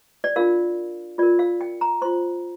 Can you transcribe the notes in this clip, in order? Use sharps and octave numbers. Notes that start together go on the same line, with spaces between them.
D5
D4 F4 A#4 F5
F4 A#4 D5
F5
G5
A#5
F4 C5 C6